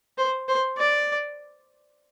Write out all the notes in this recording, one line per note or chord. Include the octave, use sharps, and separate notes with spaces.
C5
C5
D5